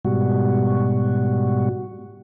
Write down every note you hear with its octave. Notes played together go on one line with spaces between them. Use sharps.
G#2 B2 G3 F#4